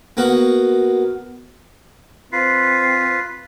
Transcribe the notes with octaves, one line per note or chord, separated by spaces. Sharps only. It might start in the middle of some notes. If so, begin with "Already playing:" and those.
A#3 B3 F#4
C4 F4 B4 C7